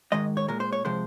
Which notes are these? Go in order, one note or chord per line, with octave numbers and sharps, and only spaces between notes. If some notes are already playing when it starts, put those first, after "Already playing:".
G#2 D#3 G#3 D#5
C#5
A#2 G#3 A#4
C5
C#5
C3 F3 G#3 C5